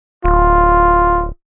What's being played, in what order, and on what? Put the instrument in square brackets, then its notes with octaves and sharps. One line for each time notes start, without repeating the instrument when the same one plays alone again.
[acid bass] D1 [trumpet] F4